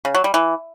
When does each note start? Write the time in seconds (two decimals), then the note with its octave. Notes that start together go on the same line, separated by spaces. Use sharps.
0.05 C#3
0.15 F#3
0.24 G3
0.34 E3